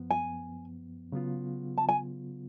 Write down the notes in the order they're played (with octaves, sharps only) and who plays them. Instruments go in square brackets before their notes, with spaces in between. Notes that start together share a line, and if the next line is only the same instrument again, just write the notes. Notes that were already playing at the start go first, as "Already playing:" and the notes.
Already playing: [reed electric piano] F#2 F3 B3
[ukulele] G#5
[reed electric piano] C#3 F#3 B3 F4
[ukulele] A5
G#5